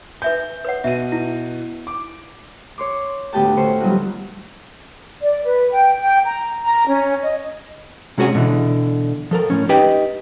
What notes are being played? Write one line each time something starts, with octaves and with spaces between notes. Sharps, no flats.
B4 E5 G#5 G6
B4 C#5 F#5
B2 E5 D#7
E4
D6
C#5 C6 D6
D2 A2 B3 G4 G5 A5
D2 C#4 A4 C5 C#6
F#3 G3 B3 D#4 F4 F#4
D5
B4
G5
G5
A#5
A#5
C#4
D#5
C3 G#3 C#4 F#4 G#4 C#5
B2 D3 E3
F3 A4 A#4
A2 C#4
D#4 G4 B4 D#5 G5